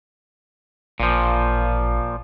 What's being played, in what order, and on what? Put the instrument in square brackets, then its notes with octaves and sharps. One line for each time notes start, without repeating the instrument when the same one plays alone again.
[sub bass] A1 [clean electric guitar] A#2 F3